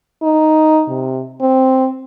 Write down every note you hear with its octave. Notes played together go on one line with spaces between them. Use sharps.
D#4
C3
C4